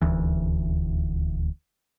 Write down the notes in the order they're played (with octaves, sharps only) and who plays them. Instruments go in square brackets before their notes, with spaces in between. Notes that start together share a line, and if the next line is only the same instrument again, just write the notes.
[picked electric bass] D#1 D2 E3